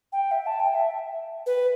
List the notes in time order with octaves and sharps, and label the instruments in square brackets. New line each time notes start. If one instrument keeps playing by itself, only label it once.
[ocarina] G5
E5
A5
G5
E5
B4